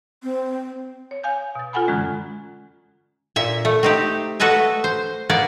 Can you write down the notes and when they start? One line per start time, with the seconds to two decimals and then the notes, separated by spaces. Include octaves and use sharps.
0.23 C4
1.11 C#5
1.23 F5 G#5 G6
1.55 B2 A6
1.73 F4 A4 F#5 G#5 B5
1.87 F#2 D3 E3 G#3 C#4
3.36 A#2 E5
3.65 A3
3.83 C4 D#4 G4
4.40 F#4 A4 B4 D#5 E5
4.84 C5
5.30 A#3 B3 D5